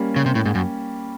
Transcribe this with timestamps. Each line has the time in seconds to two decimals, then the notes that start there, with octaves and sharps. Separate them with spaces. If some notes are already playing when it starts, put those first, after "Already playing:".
Already playing: G3 A#3 C#4
0.16 C#3
0.26 C3
0.35 A2
0.46 G#2
0.55 F#2